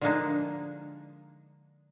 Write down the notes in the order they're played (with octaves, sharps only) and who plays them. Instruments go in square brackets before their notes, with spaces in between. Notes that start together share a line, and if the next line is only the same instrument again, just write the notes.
[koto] D3 F3 G#3 A#3 D4 D#4